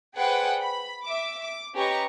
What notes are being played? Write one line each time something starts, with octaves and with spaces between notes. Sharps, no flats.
G#4 B4 C5 D5 F#5 G5
B5
E5 D6
D6
C#4 G4 B4 D#5 A#5 C#6